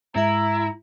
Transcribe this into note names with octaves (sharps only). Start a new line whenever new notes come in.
G#2 G#3 E4 E5 A#5